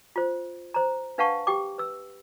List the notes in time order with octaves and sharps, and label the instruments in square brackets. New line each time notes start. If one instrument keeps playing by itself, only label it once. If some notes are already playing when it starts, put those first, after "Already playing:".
[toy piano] F4 C5
C5 A#5
D4 B4 F5 F#5 A5 C#6
G4 G5 D6
B4 E6